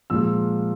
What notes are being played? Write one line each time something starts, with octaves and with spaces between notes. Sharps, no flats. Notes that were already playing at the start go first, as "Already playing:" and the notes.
A#2 F3 G#3 E6